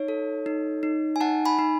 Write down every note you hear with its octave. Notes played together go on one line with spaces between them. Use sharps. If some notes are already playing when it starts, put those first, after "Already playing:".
Already playing: D#4 C#5
A4
D#4
D#4
G#5
D#4 F#5 A5
G#5 B5
D#4